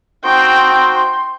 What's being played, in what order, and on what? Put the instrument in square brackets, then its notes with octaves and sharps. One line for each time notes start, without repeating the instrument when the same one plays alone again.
[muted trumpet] C4 [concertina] D#4 F#4 C5 [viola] G5 [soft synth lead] C6